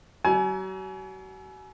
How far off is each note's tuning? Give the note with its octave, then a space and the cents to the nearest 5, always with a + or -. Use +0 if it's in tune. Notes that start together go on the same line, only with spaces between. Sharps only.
F#3 +40 G#5 +35